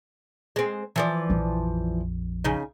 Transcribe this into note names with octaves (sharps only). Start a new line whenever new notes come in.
G#3 C4
E3 F3 D5
A#1 F2
C#3 D#4